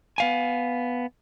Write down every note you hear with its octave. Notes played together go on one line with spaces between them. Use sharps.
B3 F5 G#5